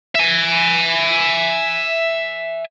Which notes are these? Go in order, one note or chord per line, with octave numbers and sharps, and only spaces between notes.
E5 G#5